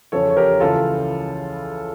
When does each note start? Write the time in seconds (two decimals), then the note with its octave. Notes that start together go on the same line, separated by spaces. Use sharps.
0.12 E2 C#3 F3 A4 C#5
0.30 C#5
0.37 G4 A#4
0.60 C#2 C#3 E3 F4 A4